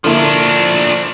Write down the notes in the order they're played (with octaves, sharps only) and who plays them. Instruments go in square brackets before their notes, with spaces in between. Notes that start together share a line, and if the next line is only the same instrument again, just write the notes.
[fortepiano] D3 A#3 E4 [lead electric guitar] F3 D4